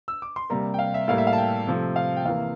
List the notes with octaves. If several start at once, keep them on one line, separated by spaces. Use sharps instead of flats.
E6
D6
C6
C3 G3 A#3 A#5
G5
F5
E5
A2 G3 A#3 F5
E5
F5
A5
G5
C3 F3 A3
F5
G5
C3 E3 A#3 F5